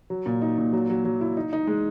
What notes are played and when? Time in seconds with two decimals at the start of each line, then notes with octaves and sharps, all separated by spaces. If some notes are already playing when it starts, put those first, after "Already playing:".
0.10 F#3
0.26 A#2
0.42 D#4
0.58 A#2
0.73 F#3
0.90 F#3
1.05 F#3
1.21 E4
1.37 D#4
1.53 D#4
1.67 G#3